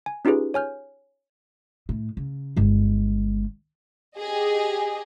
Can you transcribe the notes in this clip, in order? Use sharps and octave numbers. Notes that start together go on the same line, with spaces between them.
G#5
C#4 D#4 F4 G4 G#4 B4
C#5 G#5 F6 G6
A2
C#3
G1 G#3
G4 G#4 D#5